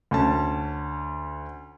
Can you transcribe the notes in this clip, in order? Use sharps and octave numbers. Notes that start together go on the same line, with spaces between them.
D2 C#4 A5